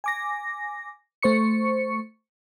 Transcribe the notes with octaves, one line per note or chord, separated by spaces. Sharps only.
G#5 D6 A#6
A3 C5 C#6 C#7